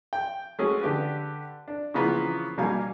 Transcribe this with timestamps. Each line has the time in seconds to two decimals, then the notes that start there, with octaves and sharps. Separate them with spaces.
0.13 G5
0.59 G#3 A3 C#4 F#4 G#4
0.81 D3 G4 B4
1.68 D4
1.94 C#3 E3 F3 A#3 B3
2.58 B2 G3 A#3 D4 F5 G#5